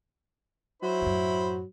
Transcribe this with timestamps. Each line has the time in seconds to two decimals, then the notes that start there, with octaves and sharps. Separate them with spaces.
0.83 F#3 E4 C5 B5
1.01 F#2 A2